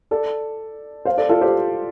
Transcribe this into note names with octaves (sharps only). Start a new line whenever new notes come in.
A4 D5
C5 F5
A4 D5
F4 A4
G4 C5